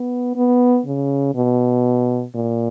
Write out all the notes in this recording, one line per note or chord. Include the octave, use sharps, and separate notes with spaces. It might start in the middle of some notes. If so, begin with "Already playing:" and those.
Already playing: B3
B3
C#3
B2
A#2